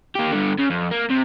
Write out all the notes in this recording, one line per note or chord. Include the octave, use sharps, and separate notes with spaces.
A#3 G4
G2 D3
C#3
F2
A#3
C3